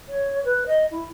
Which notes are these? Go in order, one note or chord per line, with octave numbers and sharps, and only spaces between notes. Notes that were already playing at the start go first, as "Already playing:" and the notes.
C#5
B4
D#5
E4